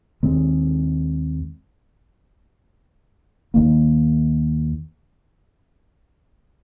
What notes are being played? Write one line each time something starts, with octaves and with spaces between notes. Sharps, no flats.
D#2 D#3 G#3 C4
D#2 D#3 A#3